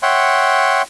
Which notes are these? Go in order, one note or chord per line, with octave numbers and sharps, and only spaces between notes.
C#5 E5 F#5 G5 C6